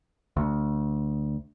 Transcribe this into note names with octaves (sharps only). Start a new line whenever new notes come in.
D2